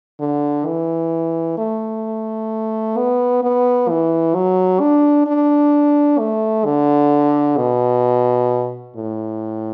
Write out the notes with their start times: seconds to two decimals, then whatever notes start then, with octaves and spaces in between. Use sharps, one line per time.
0.20 D3
0.67 E3
1.58 A3
2.97 B3
3.43 B3
3.89 E3
4.35 F#3
4.80 D4
5.27 D4
6.19 A3
6.66 D3
7.57 B2
8.96 A2